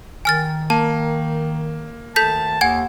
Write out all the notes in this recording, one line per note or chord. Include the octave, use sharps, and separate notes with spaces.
D#3 G#5 F6 A6
A#3 A5
D2 D#3 A4 A5 G6 B6
D#2 F#5 G#5 G#6